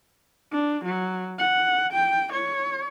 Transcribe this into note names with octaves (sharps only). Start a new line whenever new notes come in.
D4
F#3
F#5
G5
C#5